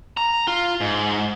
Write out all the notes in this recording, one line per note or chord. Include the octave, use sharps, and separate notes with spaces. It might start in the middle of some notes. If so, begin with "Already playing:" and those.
A#5
F4
G#2